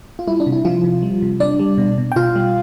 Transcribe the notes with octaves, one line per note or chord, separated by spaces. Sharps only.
F4
G3 E4
D4
C3
E4
C3 F3 F4
C3
G3
C3
G3 D4 D5
G3
B2
B2
G5
B2 F4 F5
G3